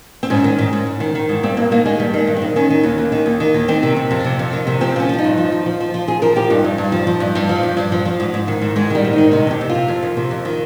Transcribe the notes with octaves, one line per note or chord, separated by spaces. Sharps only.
C4
G#2 C#4
D#3
G#2
G#2
G#2
D#3
D#3
G#2
G2 C4
G2 A#3
D#3 A#3
D#3 G#3
G2 G3
D#3 G#3
G2
C4
D#3
D#3 C#4
D#3
D#2
D#2
D#3
D#2
D#3
D#2
D#3 C4
C3
C3
F2
C3
F2
D#3
C3
F3 C4
F3 C#4
F3 F4
D#4
G2
F3
F3
F3
F3
F3 F4
F3 G#4
F3 A#4
F3 G4
G2 D#4
G2
G2
F3
F3
G2
G2
F3
G2
G2
F3
F3
G#2
G#2
D#3
G#2
G#2 G#3
D#3 G3
G#2
D#4
D#3
C3 D#4
F2 G4
C3
F4
C3
F2
D#3
C3
F2
D#3